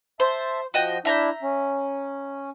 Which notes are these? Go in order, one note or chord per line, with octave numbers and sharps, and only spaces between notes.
C5 E5 A5
F3 F#4 D#5 G5
D4 E4 E5 A#5 G6
C#4